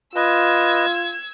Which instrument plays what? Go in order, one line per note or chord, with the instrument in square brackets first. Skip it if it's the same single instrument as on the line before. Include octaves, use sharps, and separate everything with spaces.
[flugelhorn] F4 [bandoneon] B4 D#5 [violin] E6 G#6